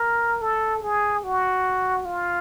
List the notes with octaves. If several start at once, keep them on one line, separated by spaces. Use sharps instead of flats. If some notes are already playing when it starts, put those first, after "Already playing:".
Already playing: A#4
A4
G#4
F#4
F4